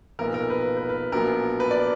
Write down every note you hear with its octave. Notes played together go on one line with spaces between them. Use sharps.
B1 A#2 F3 B3 A#4
A#4
B4
B4
B4
A#1 A#2 F#3 B3 A#4
B4
D5